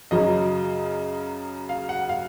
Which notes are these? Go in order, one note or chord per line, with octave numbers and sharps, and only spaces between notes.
F#2 C#3 F#3 D#5
F5
F#5
F5